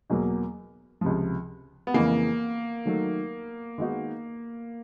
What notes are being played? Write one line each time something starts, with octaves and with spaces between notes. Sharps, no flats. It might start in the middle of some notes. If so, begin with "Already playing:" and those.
E2 B2 F#3 A#3
C#2 C3 F3
B3
F2 C#3 E3 G#3 A#3
D#3 F#3 A3
D#3 G#3 B3 D#4 F#4